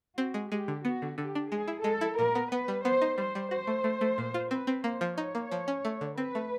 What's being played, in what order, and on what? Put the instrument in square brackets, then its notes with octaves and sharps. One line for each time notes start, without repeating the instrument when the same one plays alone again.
[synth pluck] C4 [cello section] F#4
[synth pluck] G#3
[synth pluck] G#3 [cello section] G4
[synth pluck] D3
[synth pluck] B3 [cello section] F#4
[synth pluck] D3
[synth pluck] D3 [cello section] G4
[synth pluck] D4
[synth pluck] G#3 [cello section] G#4
[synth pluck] E4
[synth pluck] G#3 [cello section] A4
[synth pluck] E4
[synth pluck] A#2 [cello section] A#4
[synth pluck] B3
[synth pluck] B3 [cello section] B4
[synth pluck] G3
[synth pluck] B3 [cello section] C5
[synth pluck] D#4
[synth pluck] G3 [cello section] C5
[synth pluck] G3
[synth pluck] F#4 [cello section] C5
[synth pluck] A3
A3
A3
A#2
F4
[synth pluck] C4 [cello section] B4
[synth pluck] C4
[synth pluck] A#3 [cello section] C5
[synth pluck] F3
[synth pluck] D#4 [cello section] C#5
[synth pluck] A#3
F3
C#4
A3
D3
[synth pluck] C4 [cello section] B4
[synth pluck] A3